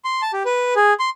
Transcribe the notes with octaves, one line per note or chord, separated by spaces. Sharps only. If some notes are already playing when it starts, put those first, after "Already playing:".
C6
A5
G4
B4
G#4
C6